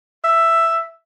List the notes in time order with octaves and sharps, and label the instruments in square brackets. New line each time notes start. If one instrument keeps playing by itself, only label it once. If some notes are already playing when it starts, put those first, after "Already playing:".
[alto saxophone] E5